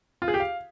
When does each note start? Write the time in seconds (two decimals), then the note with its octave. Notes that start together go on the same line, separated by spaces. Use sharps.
0.22 F4
0.28 G#4
0.34 G4
0.40 F5